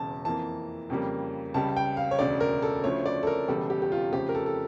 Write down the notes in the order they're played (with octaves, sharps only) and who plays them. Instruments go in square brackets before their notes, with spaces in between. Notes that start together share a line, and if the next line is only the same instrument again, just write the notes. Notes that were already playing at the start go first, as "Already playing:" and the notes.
Already playing: [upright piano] E1 E2 C#3 A5
F2 E3 A#3 A5
F2 C#3 G3 A#3
C#2 C#3 G3 A5
G5
F5
C#5
E1 D2 C#3 D5
A#4
A4
D2 C#3 F3 A3 C#5
D5
A4
A#4
E1 E2 C#3 G3 A4
G4
G4
F4
F2 C#3 F3 A3 G4
A#4
A4
A4